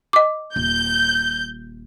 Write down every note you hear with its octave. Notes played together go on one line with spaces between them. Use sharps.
D#5 D6
D#1 G6